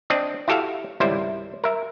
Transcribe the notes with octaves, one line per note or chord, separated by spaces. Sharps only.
C4 D4 D5 D#5
E4 F#4 G4 A4 E5 F5
G#1 C#2 C3 G3 E4 C5
A#4 E5